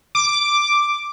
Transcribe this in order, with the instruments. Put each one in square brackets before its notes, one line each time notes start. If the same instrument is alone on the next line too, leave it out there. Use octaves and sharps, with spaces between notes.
[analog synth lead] D6